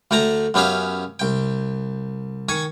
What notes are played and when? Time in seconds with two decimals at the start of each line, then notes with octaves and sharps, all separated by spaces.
0.11 D2 A3 G5 A5 A#5
0.54 F#2 B3 C#4 G4 E5 F5
1.19 C2 G5
2.49 D#3 G#5 C#6